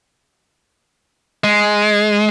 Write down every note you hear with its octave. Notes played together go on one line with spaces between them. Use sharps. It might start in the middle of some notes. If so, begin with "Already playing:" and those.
G#3